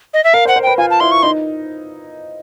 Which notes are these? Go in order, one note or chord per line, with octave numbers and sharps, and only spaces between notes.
D#5
E5
A#4 F5
C5
F#5
C5
B4 G5
F4 G#5
A5
E4 C6
C#6
D#4 C6